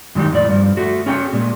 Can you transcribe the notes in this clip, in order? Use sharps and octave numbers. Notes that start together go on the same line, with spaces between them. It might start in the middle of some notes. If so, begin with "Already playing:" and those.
F#2 D#3 G#3 D#4 G4
F2 A2 D5
G2 F3
A3 F#4
C#4 G#4 C#5 G5
A#2 G#3